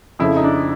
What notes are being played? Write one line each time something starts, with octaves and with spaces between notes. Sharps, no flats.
F2 C#3 F3 E4
D#4
D4